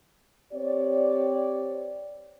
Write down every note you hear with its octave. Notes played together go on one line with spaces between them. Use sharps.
C4 G4 C#5 D5